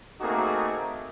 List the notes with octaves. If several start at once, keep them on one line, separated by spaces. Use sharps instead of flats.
A3 A#3 C4 D#4 F#4 G#4